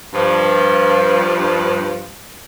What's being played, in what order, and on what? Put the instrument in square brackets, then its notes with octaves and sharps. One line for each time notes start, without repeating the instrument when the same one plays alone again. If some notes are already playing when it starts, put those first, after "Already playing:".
[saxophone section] G2 F3